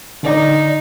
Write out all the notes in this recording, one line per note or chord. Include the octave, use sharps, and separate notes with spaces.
D3 D#4 D5